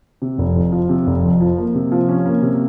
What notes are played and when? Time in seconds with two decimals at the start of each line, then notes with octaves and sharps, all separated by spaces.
0.22 C3
0.38 F1
0.56 F2
0.72 F3
0.89 C3
1.07 F1
1.24 F2
1.41 F3
1.58 A#3
1.75 C3
1.92 F3
2.09 C#4
2.26 A#3
2.42 C3